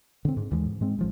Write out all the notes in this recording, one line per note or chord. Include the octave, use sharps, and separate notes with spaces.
D3 C4
G#2
D#2 E3 G#3
G#2
G#2 G#3 C4
A1 F3 G#3